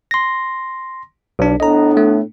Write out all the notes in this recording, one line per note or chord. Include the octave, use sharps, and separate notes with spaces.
C6 A#6
B1 D4
A2 B3 D4 D#5 A#5
A3